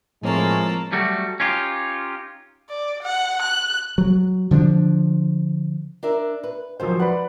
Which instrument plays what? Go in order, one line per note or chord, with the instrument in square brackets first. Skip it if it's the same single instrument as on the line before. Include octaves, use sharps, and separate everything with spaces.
[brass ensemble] A2 [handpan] F3 C4 C#5 [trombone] G#3 [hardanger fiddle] A#3 A5
[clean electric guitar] F#3 G3 A3 F#4
C#4 D#4 F4 G4
[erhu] D5
F#5
F#6
[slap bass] F#3
D3 F3 A#3 D4
[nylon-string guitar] D4 A#4 E5
B4
[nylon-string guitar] G#2 D#3 [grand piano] F3 F#3 C5
[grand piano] B4 D5 B5 [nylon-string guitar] F#5